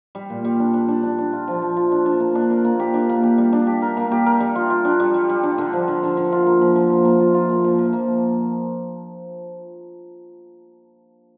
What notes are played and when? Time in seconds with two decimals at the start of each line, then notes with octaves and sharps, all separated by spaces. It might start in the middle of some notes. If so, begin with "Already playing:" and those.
0.15 G3
0.30 A#2
0.45 G3
0.60 D4
0.74 D4
0.88 D4
1.03 D4
1.18 D4
1.33 F4
1.48 F3
1.62 F3
1.77 F4
1.92 D4
2.06 D4
2.20 A#3
2.35 D4
2.50 A#4
2.64 A#3
2.80 G4
2.94 D4
3.09 A#3
3.23 G4
3.38 G3
3.53 D4
3.67 G4
3.82 A#4
3.97 A#3
4.12 G4
4.26 A#4
4.40 G3
4.55 F4
4.70 F4
4.85 D4
5.00 G3
5.14 G3
5.30 G3
5.43 D4
5.58 D3
5.73 F3
5.88 D3
6.03 D3
6.17 D3
6.32 F4
6.46 A#3
6.61 F3
6.76 F3
6.90 A#3
7.05 A#3
7.20 F4
7.34 F4
7.49 A#3
7.64 F3
7.79 F3
7.93 A#3